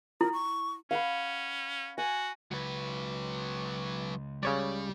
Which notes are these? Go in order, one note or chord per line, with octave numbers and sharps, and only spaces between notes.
E4 A#4
C#6
C#4 F5 F#5 B5
F#4 G#5
C#2 F#3 B4
C#3 G3 C#5 D5